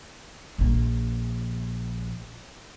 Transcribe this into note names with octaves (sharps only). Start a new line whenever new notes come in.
A#1 A#3